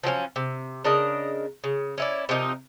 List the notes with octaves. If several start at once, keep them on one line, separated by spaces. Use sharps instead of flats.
F3 F#3 C4 C#4
C3
C#3 D4 A#4 D#5
C#3
C#4 E4 D5
C3 F3 D#4 A#4